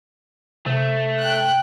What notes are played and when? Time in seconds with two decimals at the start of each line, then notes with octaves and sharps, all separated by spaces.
0.66 C3 A3
1.20 G5 F#6